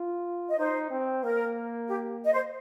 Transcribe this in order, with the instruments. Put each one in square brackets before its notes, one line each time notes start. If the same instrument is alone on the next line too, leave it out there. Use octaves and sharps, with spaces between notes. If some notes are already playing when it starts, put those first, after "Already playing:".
Already playing: [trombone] F4
[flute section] D#5
[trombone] D#4 [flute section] C5
[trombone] C4
[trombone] A#3 [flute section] A#4
[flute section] G4
D#5
C5